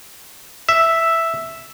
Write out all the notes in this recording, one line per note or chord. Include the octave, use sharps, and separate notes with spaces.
E5